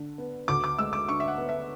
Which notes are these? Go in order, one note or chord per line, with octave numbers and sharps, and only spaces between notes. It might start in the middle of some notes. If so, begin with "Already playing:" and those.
Already playing: D3
B3
D2 D6
D6
G#3 E6
D6
D3 C#6
E5
F#5
B3
E5